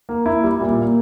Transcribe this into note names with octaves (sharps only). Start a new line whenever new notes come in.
A#3
E4
G3
A#2
A#3